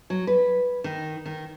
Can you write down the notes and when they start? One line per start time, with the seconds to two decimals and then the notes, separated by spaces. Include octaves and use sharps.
0.10 F#3
0.27 B4
0.84 D#3
1.26 D#3